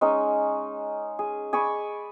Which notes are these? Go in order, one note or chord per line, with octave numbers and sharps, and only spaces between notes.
G#3 C#4 D#4
G#4
G#4 D5 B5 C#6